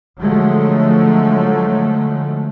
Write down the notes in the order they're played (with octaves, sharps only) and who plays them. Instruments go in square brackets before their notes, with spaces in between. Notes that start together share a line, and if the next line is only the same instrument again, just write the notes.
[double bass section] D3 F3 F#3 G#3 A3